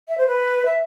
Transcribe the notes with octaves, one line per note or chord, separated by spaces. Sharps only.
E5
C5
B4
E5